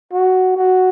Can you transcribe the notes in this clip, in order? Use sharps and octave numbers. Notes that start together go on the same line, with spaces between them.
F#4
F#4